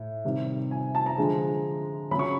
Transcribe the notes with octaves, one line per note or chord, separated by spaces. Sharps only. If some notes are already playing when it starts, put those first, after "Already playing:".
Already playing: A2
C3 D#3 G3
G#5
A5
A#5
D3 F3 G#3
C#3 F#3 B5
C#6